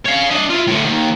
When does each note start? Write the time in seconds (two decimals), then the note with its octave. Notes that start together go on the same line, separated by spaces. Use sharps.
0.05 C#5 F5
0.30 D4 D#5
0.50 E4 F4
0.67 A2 D3
0.85 D#3 A#3